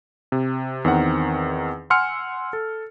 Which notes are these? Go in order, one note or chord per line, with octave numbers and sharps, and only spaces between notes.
C3
E2 D#3 C4 A#4 F#5
F#5 G#5 C6 E6 F6 C#7
A4